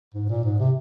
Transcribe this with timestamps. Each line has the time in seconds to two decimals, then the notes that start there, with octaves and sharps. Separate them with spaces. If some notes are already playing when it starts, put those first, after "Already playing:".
0.14 G#2
0.29 A#2
0.44 G#2
0.59 C3